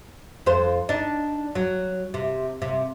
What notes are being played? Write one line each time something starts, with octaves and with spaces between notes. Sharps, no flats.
F2 C5
D4 D#4
F#3
C3
C3